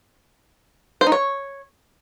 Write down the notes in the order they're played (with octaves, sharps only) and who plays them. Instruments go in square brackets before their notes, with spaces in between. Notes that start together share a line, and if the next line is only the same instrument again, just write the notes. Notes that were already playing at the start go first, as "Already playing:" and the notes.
[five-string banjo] C5
D#4
C#5